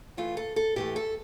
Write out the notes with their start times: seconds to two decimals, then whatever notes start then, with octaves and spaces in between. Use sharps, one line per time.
0.17 A2 E3 A3 F4
0.37 A4
0.56 A4
0.76 A2 E3 A3 G4
0.96 A4